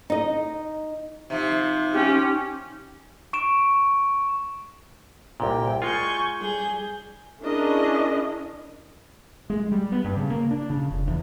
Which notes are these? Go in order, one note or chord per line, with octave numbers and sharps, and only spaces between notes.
D#4 D#5
C3 F3 D#4
C#4 G4
C#6 D7 E7
C2 A#2 G5
G#3 F4 G#5 C#6 G6
G3 G#4 G6
C#4 D4 E4 G#4 A#4 D#5
G#3
G3
B3
G2
C#3
A#3
D4
C#3
F1
E2